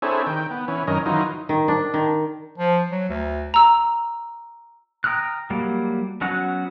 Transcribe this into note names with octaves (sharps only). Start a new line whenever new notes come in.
C4 D4 E4 G#4 A4 C#5
D#3 G5
B3
E3 C#4
F#2 D#3 C#4 A#4 D#5
D#3 E3 F#3 D#4 F4
D#3
D4
D#3
F3
F#3
D2
A#5 E6
G5 A#5 D#6 F6 F#6
F#3 G3 A#3
F#3 B3 C#4 F#4 F#5